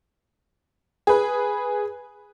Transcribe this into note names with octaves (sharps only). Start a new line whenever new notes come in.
G#4 B4